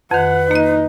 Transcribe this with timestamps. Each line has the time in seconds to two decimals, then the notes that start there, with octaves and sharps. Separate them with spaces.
0.11 F2 D#3 B4 F#5
0.51 A#3 D#4 D#5